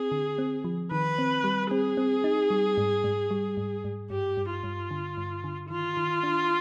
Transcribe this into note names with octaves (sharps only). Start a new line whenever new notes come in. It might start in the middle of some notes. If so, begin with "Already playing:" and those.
Already playing: C4 G#4
D3
C4
F3
D#3 B4
C4
G3
C4 G#4
C4
D#4
G3
G#2
G#2
G3
G#2
G#2
G2 G4
G2
F4
G2
D3
G2
D3
D#3 F4
D#3
D4